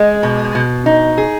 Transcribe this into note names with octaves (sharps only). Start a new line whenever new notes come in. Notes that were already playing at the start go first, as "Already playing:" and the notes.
Already playing: G#3
B2
B2
D#4
G#4